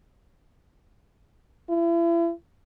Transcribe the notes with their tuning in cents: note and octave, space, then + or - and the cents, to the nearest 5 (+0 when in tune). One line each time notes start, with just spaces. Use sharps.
E4 +40